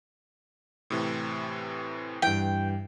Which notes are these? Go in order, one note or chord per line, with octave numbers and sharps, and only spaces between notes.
A2 C3 E3
G2 E3 G5